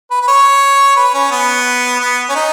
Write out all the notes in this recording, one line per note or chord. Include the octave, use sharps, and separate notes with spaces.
B4
B4
C#5
B4
C#4
B3
B3
C#4
D#4